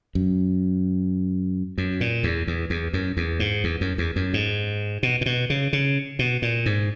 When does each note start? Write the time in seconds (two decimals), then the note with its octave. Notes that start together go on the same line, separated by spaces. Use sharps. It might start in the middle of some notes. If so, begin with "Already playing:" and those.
0.15 F#2
1.78 F#2
2.01 A#2
2.23 E2
2.47 E2
2.70 E2
2.93 F#2
3.17 E2
3.40 G#2
3.64 E2
3.81 F#2
3.98 E2
4.16 F#2
4.34 G#2
5.03 B2
5.21 A#2
5.26 B2
5.50 C#3
5.73 C#3
6.19 B2
6.42 A#2
6.66 G#2